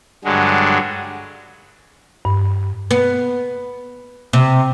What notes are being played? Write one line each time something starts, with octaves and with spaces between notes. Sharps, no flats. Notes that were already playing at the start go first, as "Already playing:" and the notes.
G2 D3 F#3 G#3
G2
B3
C3